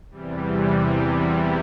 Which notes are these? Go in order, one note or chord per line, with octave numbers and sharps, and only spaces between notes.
E2 C3 E3 G3